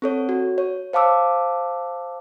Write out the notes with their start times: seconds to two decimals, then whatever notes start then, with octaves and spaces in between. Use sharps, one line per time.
0.02 C4 A4 C#5
0.29 F#4
0.58 C#5
0.93 C5 F5 A5 D6 E6